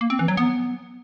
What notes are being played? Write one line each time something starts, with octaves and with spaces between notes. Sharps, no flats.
A#3
C4
E3
F#3
B3